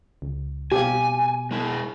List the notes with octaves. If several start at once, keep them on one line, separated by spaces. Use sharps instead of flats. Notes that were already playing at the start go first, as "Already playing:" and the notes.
C#2
B2 G4 F5 G#5
G#3 E4